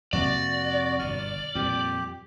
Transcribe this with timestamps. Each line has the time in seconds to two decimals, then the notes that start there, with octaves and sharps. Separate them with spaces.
0.13 F2 C3 A#3 F#4 D5
0.99 G1 B2 F6
1.55 F2 A#2 G3 G4